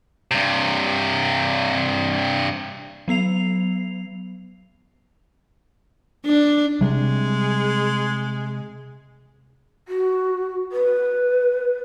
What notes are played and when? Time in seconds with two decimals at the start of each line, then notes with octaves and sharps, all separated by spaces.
0.31 G2 C3
3.08 F#3 B3 C7 F7
6.26 D4
6.81 C3 G3 G#3 C4
9.88 F#4
10.72 B4